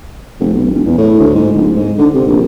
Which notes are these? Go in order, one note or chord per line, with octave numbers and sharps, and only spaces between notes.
F1
B1
E1
E2
A2
D2
G#2
D1
G#2
D3
C3
A#1